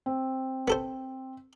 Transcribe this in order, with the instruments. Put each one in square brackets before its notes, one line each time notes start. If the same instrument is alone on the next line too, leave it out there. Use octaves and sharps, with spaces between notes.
[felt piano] C4
[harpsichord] B3 A4 C5